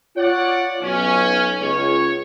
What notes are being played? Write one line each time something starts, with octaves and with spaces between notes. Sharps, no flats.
F4 C#5 D5 F#5
B1 C#4
C#2 C#5